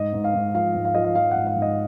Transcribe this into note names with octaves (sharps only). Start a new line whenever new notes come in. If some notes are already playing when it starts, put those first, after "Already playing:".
Already playing: G#2 D#5
G#2
F5
G#2
F3 F5
G#2
F5
F3 D#5
F5
F3 F5
G#2 F#5
F5
G#2
D#5